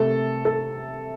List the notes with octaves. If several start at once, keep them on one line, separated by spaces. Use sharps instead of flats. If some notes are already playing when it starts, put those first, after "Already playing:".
Already playing: C3 A3 A4
A4